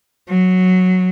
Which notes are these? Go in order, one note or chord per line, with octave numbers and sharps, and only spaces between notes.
F#3